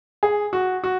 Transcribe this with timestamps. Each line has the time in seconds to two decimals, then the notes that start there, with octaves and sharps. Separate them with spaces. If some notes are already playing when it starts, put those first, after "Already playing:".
0.23 G#4
0.53 F#4
0.84 F#4